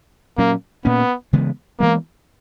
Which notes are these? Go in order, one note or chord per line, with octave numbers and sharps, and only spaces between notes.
A#2 F#3 A#3 C#4
A#2 A#3 B3 C#4
C#3 E3 G#3 B3
E3 G#3 A#3 B3